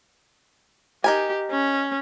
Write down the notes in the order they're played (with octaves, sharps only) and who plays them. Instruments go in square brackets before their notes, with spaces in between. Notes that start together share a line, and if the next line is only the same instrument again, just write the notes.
[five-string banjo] D#4 A#4 G#5 [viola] G4
[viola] C#4